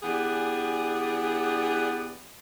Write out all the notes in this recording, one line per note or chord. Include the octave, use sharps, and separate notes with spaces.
E3 B3 D4 G4 G#4 D5